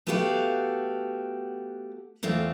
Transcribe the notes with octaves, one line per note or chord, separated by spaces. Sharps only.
A3 B3 F#4 G4 A4 F5
E2 A3 C4 F4